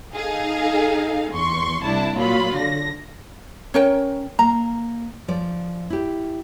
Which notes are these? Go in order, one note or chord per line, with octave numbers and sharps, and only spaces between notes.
D#4 G#4 A4 F5
E2 C6 C#6
C2 D4 E4 A5
A#2 F#3 F4 B5
D3 A#6
C#4 A#4 C#5 G5
A#3 A#5
F3 D5
E4 G4